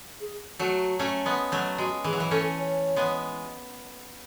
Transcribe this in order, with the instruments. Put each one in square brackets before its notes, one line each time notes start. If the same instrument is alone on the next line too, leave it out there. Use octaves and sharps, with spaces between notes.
[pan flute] G#4
[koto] F#3 A3 [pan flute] F#4
[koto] A3 C#4
G#3 B3
F#3 A3
[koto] G#3 [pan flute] F#4
[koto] E3 [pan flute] G#4
[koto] F#3
E3
[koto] A3 C#4 [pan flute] A4
[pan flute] C#5
[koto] G#3 B3